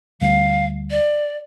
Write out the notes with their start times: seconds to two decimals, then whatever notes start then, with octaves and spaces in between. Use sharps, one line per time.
0.21 D2 D3 G3 F5
0.91 D5